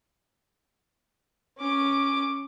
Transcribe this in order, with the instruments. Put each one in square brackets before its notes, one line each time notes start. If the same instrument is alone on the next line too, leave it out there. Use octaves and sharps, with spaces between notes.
[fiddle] C#4 D6